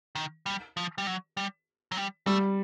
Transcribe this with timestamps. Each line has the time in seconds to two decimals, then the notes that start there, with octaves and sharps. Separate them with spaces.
0.15 D#3
0.46 G3
0.77 F3
0.98 G3
1.07 F#3
1.37 G3
1.92 F#3
1.97 G3
2.26 G3 A3